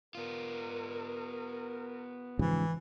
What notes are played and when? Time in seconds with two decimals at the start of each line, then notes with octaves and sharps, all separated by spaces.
0.15 B3 F4 A#4
2.39 G#2 C#3 E3 F3